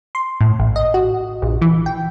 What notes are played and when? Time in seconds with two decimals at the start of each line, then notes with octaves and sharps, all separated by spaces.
0.15 C6
0.41 A2
0.60 A1
0.76 D#5
0.94 F#4
1.42 A#1
1.62 E3
1.86 G5